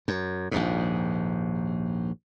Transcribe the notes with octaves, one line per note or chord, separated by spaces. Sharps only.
F#2
A#1 D#2 G#2